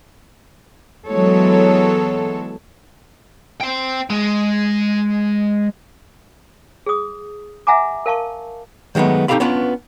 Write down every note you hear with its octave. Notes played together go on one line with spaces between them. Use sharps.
E3 F#3 G#3 B3 A4 C#5
C5 G5
G#3
G#4 D#6
E5 F#5 G#5 A#5 D6
A#4 F5 A5 C#6
D#3 F#3 G#3 A3 B3
C4 D#4 G4 A4 F5 B5
B3 C#4 D4 F4 B4